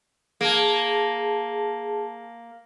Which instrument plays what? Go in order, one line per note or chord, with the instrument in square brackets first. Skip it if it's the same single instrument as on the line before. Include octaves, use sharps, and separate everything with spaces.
[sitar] A#3 [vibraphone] G#4 A5